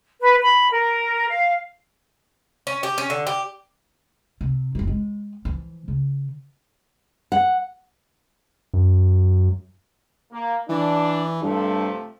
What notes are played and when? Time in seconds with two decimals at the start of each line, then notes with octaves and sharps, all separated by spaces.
0.20 B4
0.42 B5
0.70 A#4
1.28 F5
2.67 C#4
2.83 G4
2.98 C#4
3.10 D3
3.27 G4
4.41 C3
4.75 F#1 E3
4.88 G#3
5.45 E3 F3
5.88 C#3
7.32 F#5
8.74 F#2
10.32 A#3
10.69 E3 D4
11.42 G2 C3 F3 A3